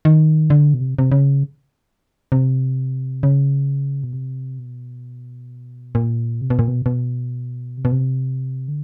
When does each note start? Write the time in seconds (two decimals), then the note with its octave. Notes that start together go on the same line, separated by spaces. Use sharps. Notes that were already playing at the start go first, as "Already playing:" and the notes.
0.05 D#3
0.50 D3
0.74 B2
0.81 C3
0.99 C3
1.12 C#3
2.32 C3
3.23 C#3
4.04 B2
4.13 C3
4.59 B2
5.95 A#2
6.41 C3
6.50 B2
6.59 A#2
6.68 B2
6.86 B2
7.78 C3
7.85 B2
7.92 C3
8.68 D3